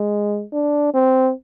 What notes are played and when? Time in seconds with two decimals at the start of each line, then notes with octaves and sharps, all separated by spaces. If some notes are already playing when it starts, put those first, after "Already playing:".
Already playing: G#3
0.52 D4
0.94 C4